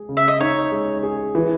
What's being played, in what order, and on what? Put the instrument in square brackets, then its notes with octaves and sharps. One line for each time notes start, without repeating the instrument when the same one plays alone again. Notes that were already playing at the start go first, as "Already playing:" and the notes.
Already playing: [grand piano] G#3 G#4
C#3
[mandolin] E5
D#5
[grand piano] D#4 [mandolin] C#5
[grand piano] G#3
G#4
E3